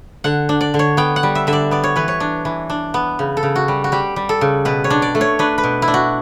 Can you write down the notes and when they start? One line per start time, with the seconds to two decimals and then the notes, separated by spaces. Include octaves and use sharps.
0.24 D3 F#5
0.49 D4
0.61 D5
0.74 D3
0.79 C#5
0.97 B3 G5
1.16 F#5
1.23 G3
1.35 E5
1.47 D3 E5
1.53 D5
1.71 B3 D5
1.84 C#5
1.96 E3 B4
2.08 C#5
2.20 D4
2.45 E3
2.70 D4
2.94 B3
3.19 C#3
3.37 A4
3.43 C#3
3.56 F#4
3.68 G3
3.84 F#4
3.92 G3 G4
4.16 G3
4.29 A4
4.41 C#3
4.65 B2 B4
4.84 C#5
4.90 D4
5.02 D5
5.15 A3
5.21 C#5
5.39 D4 B4
5.58 B4
5.63 B2
5.82 E4
5.88 D4
5.94 F#4